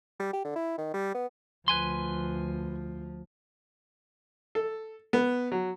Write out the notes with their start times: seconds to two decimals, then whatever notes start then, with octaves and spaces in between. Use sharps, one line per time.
0.19 G3
0.33 G4
0.44 D3
0.55 E4
0.78 D#3
0.94 G3
1.14 B3
1.68 D2 F3 B4 G#5 C6
4.55 A4
5.13 B3
5.52 F#3